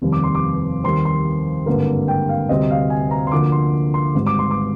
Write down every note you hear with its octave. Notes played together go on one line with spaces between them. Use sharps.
F1 D#2 D#3 G3 C4
D6
C6
D6
D#2 D#3 G3 C4 C6
C6
G#1 G2 D3 G3 A#3
G5
F5
D2 C3 G3 C4 D#5
F5
G#5
A#5
C6
D2 D3 F3 A#3 D6
C6
C6
G#1 G#2 G3
D6
C6
D6